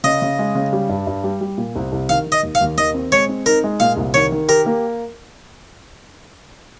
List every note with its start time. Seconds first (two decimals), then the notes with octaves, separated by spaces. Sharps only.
0.04 C#3 D#5
0.22 C#3
0.39 G#3
0.55 C#3
0.73 G3
0.89 G2
1.07 G2
1.24 G3
1.41 G3
1.57 A#2
1.76 C2
1.92 C2
2.09 D#3 F5
2.26 D#3
2.32 D#5
2.43 D#2
2.55 F5
2.61 D#2
2.78 D#3 D#5
2.94 C4
3.12 G#3 C#5
3.29 C4
3.46 D#4 A#4
3.64 G#3
3.80 A#2 F5
3.97 C2
4.14 D#3 C#5
4.32 D#3
4.48 G4 A#4
4.66 A#3